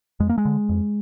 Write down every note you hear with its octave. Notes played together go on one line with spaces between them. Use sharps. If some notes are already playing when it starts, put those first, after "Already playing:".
F2 G#3
A#3
G#3
D3
F2